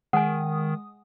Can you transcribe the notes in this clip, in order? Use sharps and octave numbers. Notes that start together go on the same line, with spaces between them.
D#3 G#3 F#5 G#5 D#6